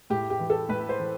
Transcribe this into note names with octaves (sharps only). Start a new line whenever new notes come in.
A2 G4
G4
E3
A4
A2 B4
C5
E3